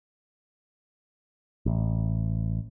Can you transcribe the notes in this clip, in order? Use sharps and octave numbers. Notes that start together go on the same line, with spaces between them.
A1